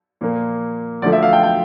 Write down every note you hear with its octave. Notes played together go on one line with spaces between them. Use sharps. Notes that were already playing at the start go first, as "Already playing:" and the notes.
A#2 F3 A#3
D2 D3 F3 A3 D5
E5
F5
G5
G5